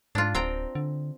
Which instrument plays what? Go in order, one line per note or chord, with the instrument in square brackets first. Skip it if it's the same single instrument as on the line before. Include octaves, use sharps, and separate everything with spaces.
[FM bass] G#2 [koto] D4 F4
[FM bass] D1 [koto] C4 G5 A#5
[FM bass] D3